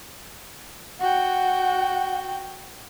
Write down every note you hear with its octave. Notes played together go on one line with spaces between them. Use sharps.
F#4 F#5 G5